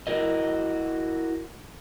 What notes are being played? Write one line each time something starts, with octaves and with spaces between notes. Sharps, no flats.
E4 F#4 A#4 D#5